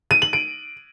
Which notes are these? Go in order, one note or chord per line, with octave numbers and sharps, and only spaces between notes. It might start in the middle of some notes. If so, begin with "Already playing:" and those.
D#7
F#7
D7